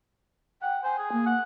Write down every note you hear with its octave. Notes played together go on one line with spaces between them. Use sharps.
F#5 G5
C5 G#5
G#4
A#3
F#5